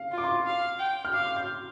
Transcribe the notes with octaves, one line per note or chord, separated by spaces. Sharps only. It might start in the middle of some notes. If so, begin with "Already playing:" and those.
Already playing: F5
F4
D6
C6
F5
G5
F6
F5 D6
G6